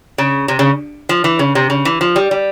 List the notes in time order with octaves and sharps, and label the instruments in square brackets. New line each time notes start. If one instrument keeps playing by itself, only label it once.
[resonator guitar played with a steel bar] C#3
C3
C#3
F3
E3
C#3
C3
C#3
E3
F3
G3
G3